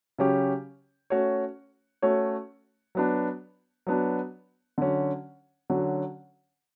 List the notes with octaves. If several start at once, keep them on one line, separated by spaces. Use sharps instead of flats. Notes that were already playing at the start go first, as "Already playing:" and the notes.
C#3 F#3 C#4 G4
A3 C#4 F#4 C#5
A3 C#4 F#4 C#5
F#3 B3 D4
F#3 B3 D4
D3 F#3 C#4
D3 F#3 C#4